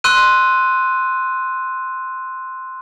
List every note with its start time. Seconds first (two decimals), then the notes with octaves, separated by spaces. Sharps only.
0.04 C6 E6 F#6 D#7